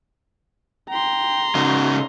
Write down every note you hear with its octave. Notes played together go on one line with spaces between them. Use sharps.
G5 A#5 C6
C#3 D#4 F#4